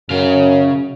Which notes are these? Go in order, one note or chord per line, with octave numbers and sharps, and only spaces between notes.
F#2 C#3 F5